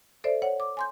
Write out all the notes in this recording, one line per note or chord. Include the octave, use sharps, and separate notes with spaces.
A4 C5 D5 E5
C#5 F#5
D6
G#5 C6 G6